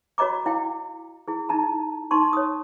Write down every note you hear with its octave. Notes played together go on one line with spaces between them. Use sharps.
F#4 C#5 D#5 A#5 D6
E4 F5 G5
E4 G#4
D#4 E4 A5 A#5
D#4 A5 C6 C#6
C#5 D#6